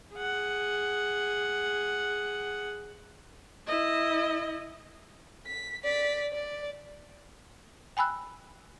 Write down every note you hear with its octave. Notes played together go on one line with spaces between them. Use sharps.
G#4 F#5
E4 D#5
B6
D5 B6
D5
G5 G#5 B5 E6 F#6